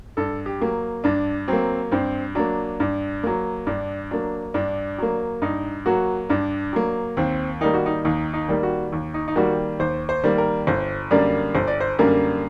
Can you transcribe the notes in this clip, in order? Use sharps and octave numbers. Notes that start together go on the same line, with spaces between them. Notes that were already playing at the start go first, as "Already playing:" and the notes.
G2 A4
G4
F#3 A#3
G2 D4
F#3 A#3 C4
G2 C4
F#3 A#3 D4
G2
F#3 A#3
G2 D4
F#3 A#3 D4
G2 D4
F#3 A#3
G2 D#4
F#3 A#3 F#4
G2 D4
F#3 A#3
D#2 C4
D#3 G3 A#3 D#4
F#4
D#4
D#2 D#4
D#4
D#3 G3 A#3
F#4
D#2
D#4
D#4
D#3 G3 A#3 F#4
D#2 C5
C5
D#3 G3 A#3
A#4
G1 C5
F#2 D3 G3 A#3 D5
G1 C5
D5
C5
F#2 D3 G3 A#3 A#4